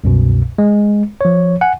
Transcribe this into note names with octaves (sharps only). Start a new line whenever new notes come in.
C2 F#2 B2
G#3
F3 C#5
F#5 G#5